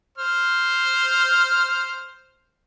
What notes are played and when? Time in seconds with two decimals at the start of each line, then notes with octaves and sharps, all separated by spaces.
0.18 C5 F6